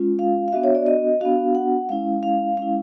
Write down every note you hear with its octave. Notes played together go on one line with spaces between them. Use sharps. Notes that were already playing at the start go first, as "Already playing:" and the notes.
Already playing: G#3 C#4 F4
F5
F5
B3 D4 F#4 E5
C#5
D5
D#5
B3 D4 F#4 F5
F#5
G#3 C#4 E4 F5
F5
G#3 C#4 E4 F5